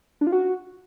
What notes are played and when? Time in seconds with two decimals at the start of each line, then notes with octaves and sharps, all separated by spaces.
0.21 D4
0.27 F4
0.32 F#4